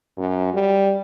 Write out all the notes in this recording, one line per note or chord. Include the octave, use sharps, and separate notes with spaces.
F#2
G3